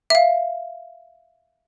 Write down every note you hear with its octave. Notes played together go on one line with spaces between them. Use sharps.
E5 F5